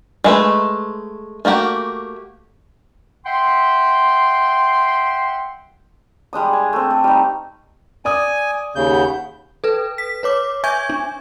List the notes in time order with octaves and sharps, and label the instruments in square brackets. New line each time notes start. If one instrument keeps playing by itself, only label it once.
[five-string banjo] G#3 A3 B4
A3 A#3 F#4 G4
[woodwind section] E5 F#5 G5 C6
[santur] G3 G#3 D4 D#6
G#5
A3 C4
A3
G3 D#4
[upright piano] D5 D6 D#6 [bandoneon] G#5
[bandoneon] D#2 C#3 G6
[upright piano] F#5 B5
[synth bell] A4 B4
B6
B4 C#5 D6
E5 G#5 C#6 G6 G#6
D4